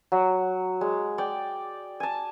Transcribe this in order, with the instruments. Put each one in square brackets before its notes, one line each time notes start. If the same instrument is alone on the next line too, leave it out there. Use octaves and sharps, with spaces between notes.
[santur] F#3
G#3
D5 G5
G#5 A5